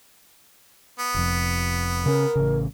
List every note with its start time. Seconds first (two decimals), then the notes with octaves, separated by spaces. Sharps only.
0.99 B3
1.15 F1 F2
2.06 C#3 C#4 A#4
2.36 A1 C#3